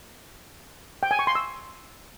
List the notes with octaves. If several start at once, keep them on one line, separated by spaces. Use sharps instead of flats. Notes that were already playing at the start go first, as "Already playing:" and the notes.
G5
G#5
C#6
C6
E6